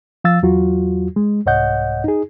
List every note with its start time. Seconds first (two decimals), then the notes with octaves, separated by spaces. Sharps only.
0.24 F3 F5 E6 A6
0.43 E2 F#3 F4 F#4
1.16 G#3
1.46 C2 G#2 C#5 D#5 F#5 G6
2.04 D#4 G#4